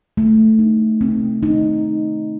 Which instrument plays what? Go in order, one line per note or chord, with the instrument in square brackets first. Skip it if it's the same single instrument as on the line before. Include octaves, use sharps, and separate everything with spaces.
[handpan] A3
D#4
C4
D#4